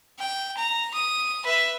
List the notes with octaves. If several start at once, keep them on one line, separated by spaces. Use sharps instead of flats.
G5
A#5
D#6
B4 E5